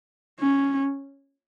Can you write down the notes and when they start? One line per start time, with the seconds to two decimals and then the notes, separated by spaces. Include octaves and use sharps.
0.40 C#4